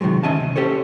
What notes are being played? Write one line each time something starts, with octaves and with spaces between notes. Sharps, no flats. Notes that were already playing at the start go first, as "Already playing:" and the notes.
C3 D#3 F3 F#3 G#3
D2 D#3 C#4 D#5 E5 A5
C3
C#4 G4 A4 C5 C#5